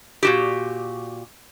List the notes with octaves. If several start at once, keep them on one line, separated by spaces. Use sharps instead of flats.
A#2 F#4 G4